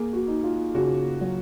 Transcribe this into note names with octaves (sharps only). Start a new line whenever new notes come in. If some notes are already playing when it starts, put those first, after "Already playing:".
Already playing: A#3 G#4
F#4
D#4
F4
C#3 F#4
F#3